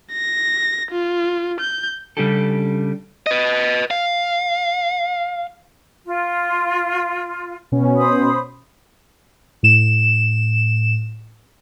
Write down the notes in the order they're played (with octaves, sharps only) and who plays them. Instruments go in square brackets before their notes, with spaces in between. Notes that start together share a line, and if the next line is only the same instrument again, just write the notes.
[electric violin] A#6
F4
G6
[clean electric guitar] C#3 G3 C#4 D4 G4 A4
[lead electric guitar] B4 D#5
F5
[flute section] F4
[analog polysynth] B2 B3 C#4
[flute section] C5 B5 D#6
[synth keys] A2 E7